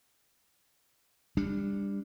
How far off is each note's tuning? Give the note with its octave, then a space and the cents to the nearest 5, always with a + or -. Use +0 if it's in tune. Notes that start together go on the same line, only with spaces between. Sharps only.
G3 +30 D4 +0